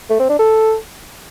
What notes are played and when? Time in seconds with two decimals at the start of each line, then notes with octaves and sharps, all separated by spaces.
0.10 A3
0.20 C4
0.29 D4
0.39 A4